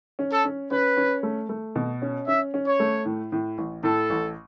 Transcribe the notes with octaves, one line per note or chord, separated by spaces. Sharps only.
C#4
A4
C#4
C#4 B4
C#4
A3
A3
B2
C#4
C#4 E5
C#4
C#5
A3
A2
A2
A1
A2 A4
A1